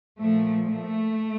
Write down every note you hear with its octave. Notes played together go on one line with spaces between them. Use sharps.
A#2 F3 A3
A3